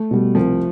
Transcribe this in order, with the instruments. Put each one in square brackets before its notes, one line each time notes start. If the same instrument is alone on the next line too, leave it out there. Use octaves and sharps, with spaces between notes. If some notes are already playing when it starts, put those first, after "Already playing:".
Already playing: [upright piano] A3
[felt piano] B2 G3
[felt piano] C2 [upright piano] F3